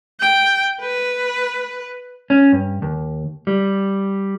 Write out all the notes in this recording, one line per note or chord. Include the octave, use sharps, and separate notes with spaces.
G5
B4
C#4
G2
D#2
G3